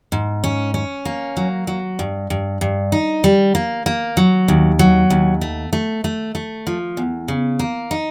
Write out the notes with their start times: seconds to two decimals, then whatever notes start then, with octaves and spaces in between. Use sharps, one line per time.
0.12 G#2
0.44 C#4
0.74 C#4
1.05 A#3
1.37 F#3
1.67 F#3
1.99 G2
2.30 G2
2.61 G2
2.92 D#4
3.24 G3
3.55 A#3
3.86 A#3
4.17 F#3
4.48 D#2
4.79 F#3
5.10 D#2
5.41 A3
5.73 A3
6.04 A3
6.35 A3
6.67 F3
6.97 E2
7.28 C#3
7.59 A#3
7.91 D#4